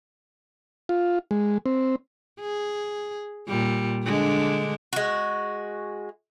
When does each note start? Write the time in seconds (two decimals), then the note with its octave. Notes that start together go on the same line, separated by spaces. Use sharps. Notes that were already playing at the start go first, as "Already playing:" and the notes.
0.89 F4
1.31 G#3
1.66 C4
2.40 G#4
3.48 A#2 G3
4.04 D3 G#3 D4
4.93 G#3 F#4